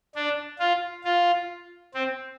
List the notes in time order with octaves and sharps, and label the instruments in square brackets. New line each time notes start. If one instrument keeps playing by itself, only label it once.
[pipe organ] D4
F4
F4
C4